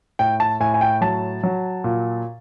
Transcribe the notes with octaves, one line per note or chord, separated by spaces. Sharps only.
A2 G5
A5
A2 G#5
G#5
G5
F#3 A5
F#3
A#2